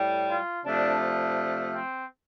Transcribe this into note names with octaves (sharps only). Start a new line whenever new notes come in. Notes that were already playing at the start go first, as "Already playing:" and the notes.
Already playing: A2 G3
F4
C3 F3 A3 D4
D4
C4